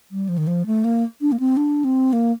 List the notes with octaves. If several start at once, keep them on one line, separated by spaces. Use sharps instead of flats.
G3
F3
D#3
F3
A3
A#3
D4
A#3
C4
D4
C4
A#3